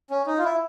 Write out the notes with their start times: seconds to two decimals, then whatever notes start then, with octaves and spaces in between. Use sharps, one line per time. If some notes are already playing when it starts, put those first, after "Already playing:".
0.10 C#4
0.26 D#4
0.38 F4
0.44 E4